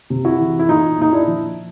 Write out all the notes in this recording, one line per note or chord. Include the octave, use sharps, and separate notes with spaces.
C3
E4 F#4
E3
E4
A#2 D#4 F4
A#2 D#4
D4 E4
F3